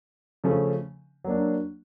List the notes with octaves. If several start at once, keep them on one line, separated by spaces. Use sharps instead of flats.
C#3 F3 A3 C#4
F#3 A#3 D4